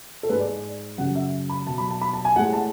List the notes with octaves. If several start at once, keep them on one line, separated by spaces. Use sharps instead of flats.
A4
G#2 G#3 B4
D5
D5
F#2 C#3 F#3 F#5
E5
B5
B2 F#3 A5
B5
A5
B5
A5
G#5
A2 G#3 F#5
A5